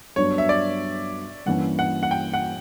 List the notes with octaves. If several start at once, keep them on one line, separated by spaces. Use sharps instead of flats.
G2 F#3 B3 D4 C#5
E5
D5
G2 E3 A#3 C#4 F#5
F#5
F#5
G5
F#5